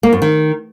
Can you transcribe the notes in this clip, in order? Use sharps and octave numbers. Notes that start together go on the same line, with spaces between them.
A#3
F#2
D#3